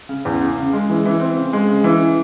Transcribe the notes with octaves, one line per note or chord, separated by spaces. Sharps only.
C#3
E2
C#3
C#3
G#3
E3
E3
C4
C#3
G#3
C#3
E3